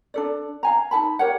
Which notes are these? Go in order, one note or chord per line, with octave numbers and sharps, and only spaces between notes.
D4 A4 D5
F5 G#5 A#5
D#4 A4 A5 B5
G4 A#4 C#5 F#5